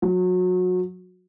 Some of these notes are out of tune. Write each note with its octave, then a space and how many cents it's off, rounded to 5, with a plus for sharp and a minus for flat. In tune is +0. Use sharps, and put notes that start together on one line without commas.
F#3 -25